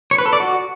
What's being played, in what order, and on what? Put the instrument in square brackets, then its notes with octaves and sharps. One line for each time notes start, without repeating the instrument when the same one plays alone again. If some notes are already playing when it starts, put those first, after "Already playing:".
[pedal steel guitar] C#5
B4
A4
D5
F#4